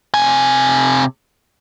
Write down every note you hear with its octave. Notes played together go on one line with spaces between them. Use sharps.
C3 G#5